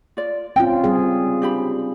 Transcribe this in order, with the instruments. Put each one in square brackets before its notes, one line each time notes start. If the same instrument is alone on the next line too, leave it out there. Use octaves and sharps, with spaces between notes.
[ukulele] F4 D5
[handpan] C4 C#4 F4 [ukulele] G5
[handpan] G3 C4 G#4
[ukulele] D4 G4 B5